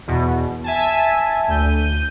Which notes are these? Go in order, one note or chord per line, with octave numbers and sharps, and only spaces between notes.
E2 B2
E5 G#5 A5
D2 G6 D#7